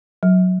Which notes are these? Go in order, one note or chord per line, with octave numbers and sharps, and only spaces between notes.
F#3